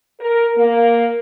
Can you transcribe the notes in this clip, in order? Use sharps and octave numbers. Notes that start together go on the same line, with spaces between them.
A#4
A#3